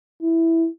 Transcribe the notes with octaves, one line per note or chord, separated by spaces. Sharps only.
E4